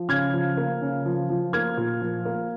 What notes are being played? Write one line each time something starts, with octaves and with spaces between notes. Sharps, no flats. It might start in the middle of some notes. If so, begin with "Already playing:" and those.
Already playing: F3
C#3 F6 G#6
F3
A#3
C#3
F3
F3
A#3 F6 G#6
A#2
F3
A#3